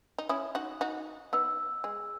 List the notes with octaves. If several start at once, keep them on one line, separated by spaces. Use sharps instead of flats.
D#4
C#4 E4 D#6
D#4 F#4
D#4 F#4
B3 D#4 E6
G#3